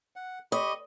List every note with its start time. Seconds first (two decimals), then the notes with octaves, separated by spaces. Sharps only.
0.16 F#5
0.52 G4 D#5 B5 C#6